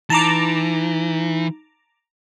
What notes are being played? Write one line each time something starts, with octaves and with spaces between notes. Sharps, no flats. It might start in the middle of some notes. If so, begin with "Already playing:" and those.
E3 D#4 A5 A#5 D6